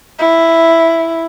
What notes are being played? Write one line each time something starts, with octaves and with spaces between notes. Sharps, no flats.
E4